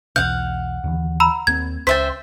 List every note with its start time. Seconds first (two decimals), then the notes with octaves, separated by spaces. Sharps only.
0.16 B1 E2 F5 F#5 G6
0.84 D#2 D3 E3
1.20 A#5 B5 E6
1.47 D#2 A#3 C4 G#6
1.87 C#2 C#4 C5 E5 G5 A6 B6